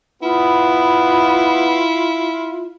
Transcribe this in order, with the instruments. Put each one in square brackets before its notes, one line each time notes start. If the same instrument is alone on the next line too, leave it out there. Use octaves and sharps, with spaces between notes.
[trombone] B3 [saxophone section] E4 F4